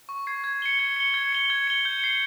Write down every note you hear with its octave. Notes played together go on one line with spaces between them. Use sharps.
C#6
G#6 C7
G#6
C#7 G7
G#6
C#7 G7
G#6
C#7 G7
G#6
C#7 G7
G6
C7 G7